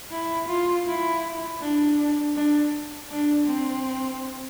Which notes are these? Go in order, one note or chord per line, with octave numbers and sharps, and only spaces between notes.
E4
F4
E4
D4
D4
D4
C4